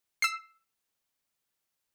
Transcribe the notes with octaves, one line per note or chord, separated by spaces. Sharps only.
E6 C7